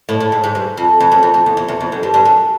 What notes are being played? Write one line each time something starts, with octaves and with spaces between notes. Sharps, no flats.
A2
A2
G#2
G#2
G2
F2
F2
F#2
F2
F2
E2
F2
E2
F2
F#2
G2
G2
F#2